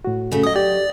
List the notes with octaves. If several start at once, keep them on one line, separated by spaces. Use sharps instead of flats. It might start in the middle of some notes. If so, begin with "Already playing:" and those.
A2 F#4
C#3 A3
F#3 D#5 D#6
G4 D5